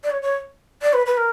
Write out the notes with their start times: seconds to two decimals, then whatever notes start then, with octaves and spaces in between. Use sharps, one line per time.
0.04 D5
0.11 C#5
0.22 C#5
0.82 D5
0.93 B4
1.06 B4
1.17 A#4